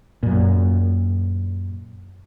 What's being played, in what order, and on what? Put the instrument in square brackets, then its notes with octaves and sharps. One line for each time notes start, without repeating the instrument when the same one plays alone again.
[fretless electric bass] F#2 A#2